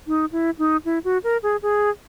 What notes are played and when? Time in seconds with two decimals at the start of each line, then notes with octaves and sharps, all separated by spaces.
0.07 D#4
0.32 E4
0.59 D#4
0.85 E4
1.04 F#4
1.24 A#4
1.43 G#4
1.62 G#4